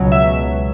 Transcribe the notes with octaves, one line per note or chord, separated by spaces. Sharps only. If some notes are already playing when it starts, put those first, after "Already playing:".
Already playing: C#2 B2 F#3
E5